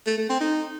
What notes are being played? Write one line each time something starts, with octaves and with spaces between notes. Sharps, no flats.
A3
A3
C4
D#4